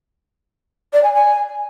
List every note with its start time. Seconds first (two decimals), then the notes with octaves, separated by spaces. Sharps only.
0.93 D5
1.03 G#5
1.13 G#5